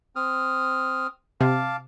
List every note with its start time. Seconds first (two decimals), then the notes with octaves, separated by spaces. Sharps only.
0.16 C4 D#6 F6
1.41 C3 F5 A5 D6